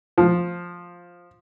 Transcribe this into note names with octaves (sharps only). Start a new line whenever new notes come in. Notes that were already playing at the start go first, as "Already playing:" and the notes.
F3